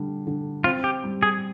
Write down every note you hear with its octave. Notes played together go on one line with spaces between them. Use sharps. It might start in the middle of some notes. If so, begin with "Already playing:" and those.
Already playing: D3 G3
D3
C4 F4
G4
G3
G#4